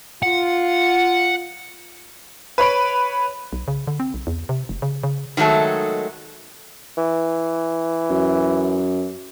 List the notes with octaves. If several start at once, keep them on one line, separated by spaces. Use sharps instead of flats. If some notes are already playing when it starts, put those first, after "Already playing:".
F4 F#5
B4 C#5 B5 D7
B1
C#3
D3
C4
B1
E2
C3
F1
C#3
C#3
D#3 F#3 G#3 A3 A4
E3
F#2